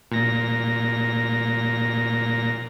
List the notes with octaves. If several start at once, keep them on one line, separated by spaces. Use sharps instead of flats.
A#2 A#6